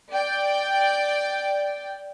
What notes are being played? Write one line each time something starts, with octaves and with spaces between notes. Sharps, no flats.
D5 G5